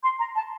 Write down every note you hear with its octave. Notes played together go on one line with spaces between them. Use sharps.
C6
A#5
A5